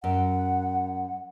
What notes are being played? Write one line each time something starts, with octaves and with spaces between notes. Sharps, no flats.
F#2 F#5